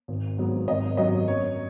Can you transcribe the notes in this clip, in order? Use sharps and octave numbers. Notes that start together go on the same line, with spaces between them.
G#1
G#2 F#3 B3
G#1 D#5
F#2 F#3 D#5
F#2 C#5